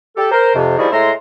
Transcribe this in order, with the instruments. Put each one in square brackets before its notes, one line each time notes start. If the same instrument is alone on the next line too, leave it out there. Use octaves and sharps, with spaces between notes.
[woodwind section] G4 A4
A#4 C5
F2 C3
D#3 F3 G3 E4 F#4 G#4
A2 G#3 E5 A#5 C6